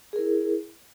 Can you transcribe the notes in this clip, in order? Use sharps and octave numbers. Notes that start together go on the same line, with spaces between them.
E4 G#4 A#4